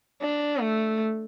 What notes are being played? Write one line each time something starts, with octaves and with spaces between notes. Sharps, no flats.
D4
A3